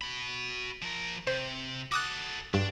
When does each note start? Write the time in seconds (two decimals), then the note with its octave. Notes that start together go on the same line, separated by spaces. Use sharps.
0.01 F#4 B5
0.82 F3 A#4
1.27 C3 C5
1.92 F#4 A4 D6 D#6 F#6
2.54 G2 D4